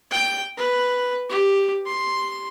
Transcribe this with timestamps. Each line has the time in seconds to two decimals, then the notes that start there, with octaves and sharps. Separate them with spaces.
0.11 G5
0.57 B4
1.30 G4
1.86 C6